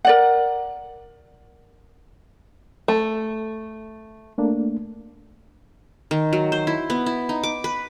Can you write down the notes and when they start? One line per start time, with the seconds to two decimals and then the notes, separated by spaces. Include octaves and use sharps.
0.05 A#4 D5 F#5
2.88 A3
4.38 A3 A#3 D4
6.11 D#3
6.33 F#3
6.52 C5
6.67 E4
6.90 B3
7.06 E4
7.29 D#4
7.43 D6
7.64 B4